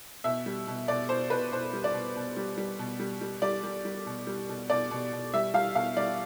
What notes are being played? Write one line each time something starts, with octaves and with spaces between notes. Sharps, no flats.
B2 E5
G3
B2
B2 D5
B2 C5
B2 B4
B2 C5
G3
D5
B2
B2
G3
G3
B2
G3
G3
G3 D5
G3
G3
B2
G3
B2
B2 D5
B2
B2
G3 E5
G3 F5
B2 F5
G3 D5